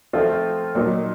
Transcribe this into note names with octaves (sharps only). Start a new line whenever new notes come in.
F3 A3 C4 F4
A#2 F#3 A#3 D#4